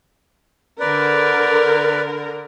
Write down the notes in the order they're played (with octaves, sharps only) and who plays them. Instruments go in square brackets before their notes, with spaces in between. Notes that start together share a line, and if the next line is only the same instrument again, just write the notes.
[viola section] D3 A#4 [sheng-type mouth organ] B4 D5